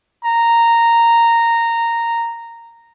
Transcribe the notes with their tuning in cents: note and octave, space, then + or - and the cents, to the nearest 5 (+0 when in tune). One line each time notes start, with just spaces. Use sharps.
A#5 -10